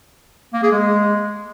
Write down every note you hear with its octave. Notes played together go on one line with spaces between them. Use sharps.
A#3
G#4
G#3